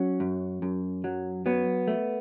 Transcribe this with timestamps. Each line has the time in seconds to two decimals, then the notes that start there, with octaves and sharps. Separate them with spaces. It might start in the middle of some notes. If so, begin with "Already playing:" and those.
Already playing: F#3 C#4
0.20 F#2
0.62 F#2
1.04 F#3
1.46 F#3 B3
1.88 A3